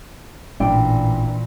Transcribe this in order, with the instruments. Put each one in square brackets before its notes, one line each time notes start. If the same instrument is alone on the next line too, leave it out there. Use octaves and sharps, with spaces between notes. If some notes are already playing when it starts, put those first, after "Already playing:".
[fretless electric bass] A1 [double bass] A#2 E3 [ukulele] D4 G5